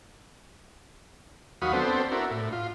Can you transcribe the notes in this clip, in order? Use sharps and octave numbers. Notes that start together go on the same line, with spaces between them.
D#2 F#3 F#4 F5 B5 D#6
B3 C4 D4 A4 C5
D4 E4 F#4 A#4
A2
F4